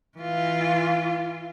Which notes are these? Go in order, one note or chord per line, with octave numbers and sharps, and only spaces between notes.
E3 F4